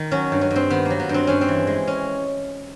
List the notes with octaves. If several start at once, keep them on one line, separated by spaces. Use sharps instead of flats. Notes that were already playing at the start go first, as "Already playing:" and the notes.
Already playing: D#3
F#3 C#4
G2
C#4
G2
C4
D#3 B3
F#3 A#3
B3
G2 C4
G2 C#4
C4
E3
G#3
C#4